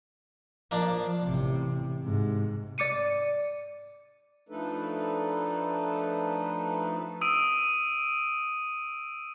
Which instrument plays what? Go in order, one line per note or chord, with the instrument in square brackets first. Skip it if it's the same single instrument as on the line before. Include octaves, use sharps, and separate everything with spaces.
[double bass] F3 [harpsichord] A#3 D4 D5
[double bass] A1 C3
G#2 C3
[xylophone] D5 D6 C#7 D#7
[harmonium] F3 A3 D4 D#4 A4 B4
[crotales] D#6 E6 D7 D#7